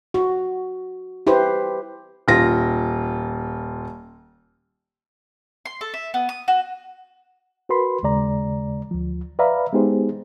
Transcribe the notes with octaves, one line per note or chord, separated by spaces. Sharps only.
F#4
E4 G4 B4 C5
D#1 F4 A#6
C6
A4
E5
B3
D#6
F#4
F#4 A#4 B4 B5 C6
D#2 C#3 G#3 D5 A#5
D2 F3
B4 D5 E5 F5 A#5 B5
G#3 B3 D#4 G4 G#4 C5